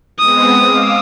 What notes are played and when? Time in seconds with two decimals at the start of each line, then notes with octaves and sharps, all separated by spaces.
0.19 G#3 B3 C4 D#6
0.63 F5 D6 E6